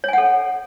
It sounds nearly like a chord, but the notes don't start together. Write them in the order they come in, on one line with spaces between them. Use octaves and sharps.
C#5 G#5 F#5 A4